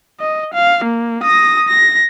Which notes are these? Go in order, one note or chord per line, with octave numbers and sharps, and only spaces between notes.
D#5
F5
A#3
D#6 A#6
A#6